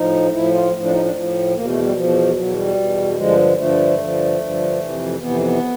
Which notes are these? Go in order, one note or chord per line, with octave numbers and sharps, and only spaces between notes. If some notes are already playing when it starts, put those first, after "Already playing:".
Already playing: A2 F3 D#4
A2 F3 E4
F4
A2 F3
D4
D#4
D4
A2 F3
E2 B2 A#3
A3
G3
E2 B2 F3
E2 B2 F#3
G3
E2 B2
G2 D3 F3 G#3
G2 D3 F3 A3
G2 D3 F3
G2 D3 F3
F2 C3 E3
F2 C3 E3 B3
B3